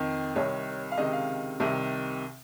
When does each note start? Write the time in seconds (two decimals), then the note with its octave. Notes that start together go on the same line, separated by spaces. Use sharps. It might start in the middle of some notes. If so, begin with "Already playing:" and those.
Already playing: F2 D#3
0.35 C2 C3 D#3 C#5
0.91 F5
0.98 C#2 C3 D#3 D#5
1.13 F5
1.60 C2 C3 D#3